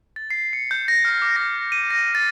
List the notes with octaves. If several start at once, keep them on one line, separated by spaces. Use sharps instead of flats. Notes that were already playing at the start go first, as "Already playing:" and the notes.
A6
C7
C#7
G6
A#6
F6
D6
A#6
D#7
A#6
A6